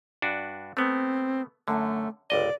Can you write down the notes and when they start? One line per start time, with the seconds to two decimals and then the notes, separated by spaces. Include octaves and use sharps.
0.22 G2 D4 F#4
0.77 A3 B3 C4
1.68 F#2 D3 A3
2.30 G1 C#2 D5 D#5